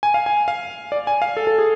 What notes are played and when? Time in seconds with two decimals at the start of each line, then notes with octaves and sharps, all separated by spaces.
0.03 G#5
0.14 F5
0.26 G#5
0.48 F5
0.92 D5
1.07 G#5
1.22 F5
1.37 A4
1.47 A4
1.58 G#4